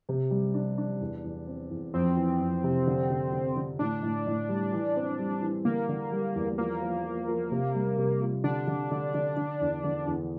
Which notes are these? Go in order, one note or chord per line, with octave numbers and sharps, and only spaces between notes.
C3
G3
D4
D4
E2
E2
C4
E2
F2 C4
E3
F2
C3
D3
D3
D3
D3
A2 D4
A2
A2
G3
E3
C4
G3
E3
D3 A#3
D3
G3
E2
F3 A#3
F3
F3
F3
C3
G3
C3
F4
D3 D4
D3
D3
D3
D3
E2
D3
E2